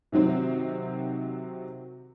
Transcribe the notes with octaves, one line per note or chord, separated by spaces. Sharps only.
C3 D#3 F#3 C4